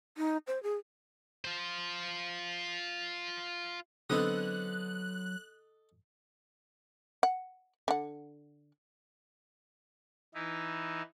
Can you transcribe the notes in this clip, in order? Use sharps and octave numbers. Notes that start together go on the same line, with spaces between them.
D#4
C5
G#4
F4 C5
D3 F#3 B3 C4 A4 D#5 D#6 F#6
F#5
D3 F#5
E3 D#4 E4